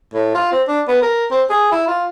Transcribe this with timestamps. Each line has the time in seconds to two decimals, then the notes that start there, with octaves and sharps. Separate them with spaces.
0.14 A2
0.35 F4
0.52 C4
0.68 D4
0.88 B3
1.02 A#4
1.31 C4
1.50 G#4
1.72 E4
1.88 F4